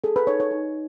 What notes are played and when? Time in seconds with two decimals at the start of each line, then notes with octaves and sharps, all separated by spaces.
0.04 G#4 A4
0.16 B4
0.27 D#4 C#5
0.40 C#5
0.51 D#4